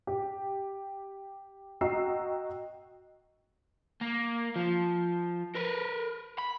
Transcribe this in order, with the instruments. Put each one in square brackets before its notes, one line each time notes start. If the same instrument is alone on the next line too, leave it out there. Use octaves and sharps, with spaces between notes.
[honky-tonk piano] G4
F#4 D#5 G5 A#5 E6 C7
[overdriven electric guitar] A#3
F3
A#4 B4
B5